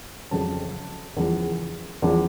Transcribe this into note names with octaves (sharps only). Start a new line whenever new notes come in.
F2 C#3 F#3 A5
E2 C#3 F3
E2 C#3 F3